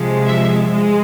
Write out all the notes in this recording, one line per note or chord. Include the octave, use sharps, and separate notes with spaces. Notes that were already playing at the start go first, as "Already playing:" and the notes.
Already playing: C3 F3 G#3
E5
G#3